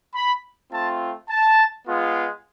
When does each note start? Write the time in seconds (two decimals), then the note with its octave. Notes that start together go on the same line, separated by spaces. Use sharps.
0.15 B5
0.71 A3 C4 F4 A5
1.29 A5
1.87 G#3 B3 F4